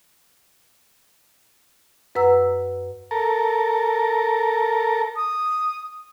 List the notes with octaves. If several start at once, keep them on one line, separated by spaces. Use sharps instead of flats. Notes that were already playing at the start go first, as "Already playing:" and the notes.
F#2 B4 F#5 A#5 E6
A4 A#4
D#6